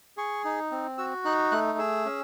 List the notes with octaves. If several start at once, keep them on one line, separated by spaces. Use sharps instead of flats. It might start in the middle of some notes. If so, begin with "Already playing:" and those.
G#4 C#6
D#4
C4
F#4 E6
D#4 F#6
A3 F#6
G#4 E6
C#4